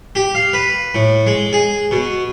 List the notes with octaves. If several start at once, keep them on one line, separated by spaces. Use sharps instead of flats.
G4
F5
B4
A2
G#3
G#4
B2